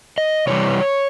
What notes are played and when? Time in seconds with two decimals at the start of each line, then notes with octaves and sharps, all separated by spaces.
0.18 D#5
0.47 C3 E3 G3 C#5